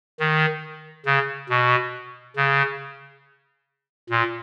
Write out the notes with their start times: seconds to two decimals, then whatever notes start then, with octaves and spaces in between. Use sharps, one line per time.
0.20 D#3
1.06 C#3
1.50 B2
2.36 C#3
4.10 A#2